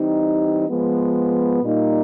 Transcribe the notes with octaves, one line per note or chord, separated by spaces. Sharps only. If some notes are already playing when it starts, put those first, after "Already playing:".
Already playing: E3 G3 C4 D#4 G4
F3 G#3 B3
A#2 G3 A#3 D#4